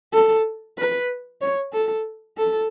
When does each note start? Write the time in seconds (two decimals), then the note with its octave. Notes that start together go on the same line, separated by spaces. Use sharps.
0.13 A4
0.78 B4
1.41 C#5
1.73 A4
2.38 A4